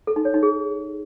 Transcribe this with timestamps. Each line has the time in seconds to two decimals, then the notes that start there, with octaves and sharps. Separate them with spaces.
0.07 A4
0.16 D#4
0.25 C#5
0.34 D#4
0.43 G#4